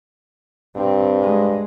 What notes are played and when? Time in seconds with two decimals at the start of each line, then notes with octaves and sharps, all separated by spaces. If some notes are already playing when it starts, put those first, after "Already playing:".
0.76 G2 C4
1.22 G#3